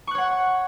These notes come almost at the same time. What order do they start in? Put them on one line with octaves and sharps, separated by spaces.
C#6 F#6 C#5 F#5